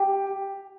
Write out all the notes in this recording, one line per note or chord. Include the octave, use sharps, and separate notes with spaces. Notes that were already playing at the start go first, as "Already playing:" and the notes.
Already playing: G4